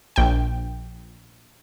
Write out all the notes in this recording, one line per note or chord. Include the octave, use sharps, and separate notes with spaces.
A#1 G5